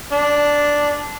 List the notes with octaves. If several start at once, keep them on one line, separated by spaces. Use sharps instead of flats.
D4